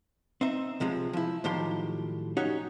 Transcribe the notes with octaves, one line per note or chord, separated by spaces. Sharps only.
C4 D#4 E5
C#2 C3 F3 G#3
F3 E4
A2 D#3 F3 F#3 G4 C6
C#4 D#4 F#4 G4 C#5 F#5